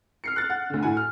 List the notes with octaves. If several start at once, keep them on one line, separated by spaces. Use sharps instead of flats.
F6 C7 C#7
F#6 A6
F#5
D2 D3
A2 E4 F#4 F#5 G#5
F6